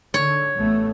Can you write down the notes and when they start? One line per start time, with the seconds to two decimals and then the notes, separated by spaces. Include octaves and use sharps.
0.14 D3 C#5
0.55 A1 A3 B3